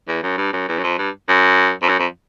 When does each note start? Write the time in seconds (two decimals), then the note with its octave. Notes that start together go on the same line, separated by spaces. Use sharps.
0.08 E2
0.23 F#2
0.38 G2
0.53 F#2
0.68 E2
0.79 F#2
0.84 F2
0.98 G2
1.29 F#2
1.82 F2
1.89 F#2
1.99 F2